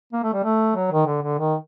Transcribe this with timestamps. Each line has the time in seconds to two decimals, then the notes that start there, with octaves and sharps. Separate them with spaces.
0.13 A#3
0.23 A3
0.33 G3
0.44 A3
0.76 F#3
0.91 D#3
1.07 D3
1.22 D3
1.39 D#3